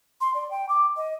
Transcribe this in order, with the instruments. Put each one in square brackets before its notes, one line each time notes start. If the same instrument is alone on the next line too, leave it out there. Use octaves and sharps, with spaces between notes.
[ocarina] C6
D5
G5
D6
D#5